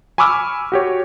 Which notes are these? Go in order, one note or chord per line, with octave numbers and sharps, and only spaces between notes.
G#5 B5 C#6 D6 E6 F6
F#4 G4 C#5